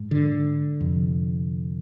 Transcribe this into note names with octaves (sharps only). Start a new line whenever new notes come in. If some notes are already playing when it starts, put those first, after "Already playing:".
Already playing: G#2
D3
F2 C3